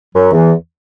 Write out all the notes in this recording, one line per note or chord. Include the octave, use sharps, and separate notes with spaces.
F#2 F#3
E2 E3